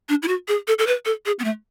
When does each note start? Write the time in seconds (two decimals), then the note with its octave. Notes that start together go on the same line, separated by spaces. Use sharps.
0.09 D4
0.23 E4
0.28 F#4
0.48 G#4
0.68 A4
0.79 A4
0.87 B4
1.05 A4
1.26 G#4
1.39 B3
1.44 A3